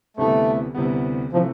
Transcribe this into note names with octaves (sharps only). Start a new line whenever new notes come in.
D2 C3 E3 G3 A3 B3
D2 C3 E3 G3 B3
C3 E3 F3 A3